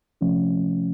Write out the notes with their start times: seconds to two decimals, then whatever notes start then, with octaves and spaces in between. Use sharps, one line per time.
0.21 C3 F3 A3 C#4